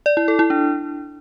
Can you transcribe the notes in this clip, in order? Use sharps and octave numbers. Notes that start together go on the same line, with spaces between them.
D5
E4
A4
E4
D4